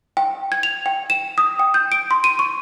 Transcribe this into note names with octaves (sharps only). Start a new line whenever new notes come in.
G5
G#6
F7
G5
E7
D#6
G5
G6
D7
C6
D#7
C#6